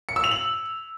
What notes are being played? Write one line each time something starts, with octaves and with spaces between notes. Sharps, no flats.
C#7
E6
F7
F#7